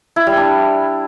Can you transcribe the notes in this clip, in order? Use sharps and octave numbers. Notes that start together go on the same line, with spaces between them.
E4
G3
D4